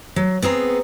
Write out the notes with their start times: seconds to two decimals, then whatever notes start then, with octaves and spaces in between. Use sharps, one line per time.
0.16 F#3
0.42 B3 C4 G#4 A#5